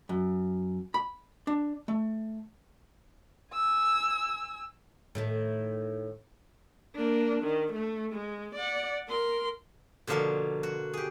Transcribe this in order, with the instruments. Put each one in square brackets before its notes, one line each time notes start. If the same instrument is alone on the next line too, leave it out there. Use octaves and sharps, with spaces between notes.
[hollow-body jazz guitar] F#2
B5
D4
A3
[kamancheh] G#5 E6
[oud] A2 D#3 A3
[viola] A#3 D4
D#3
A3
G#3
D5 F#5
A#4 C6
[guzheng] B2 D3 F3 A#3 C#5 C6
F#4
G4 G#4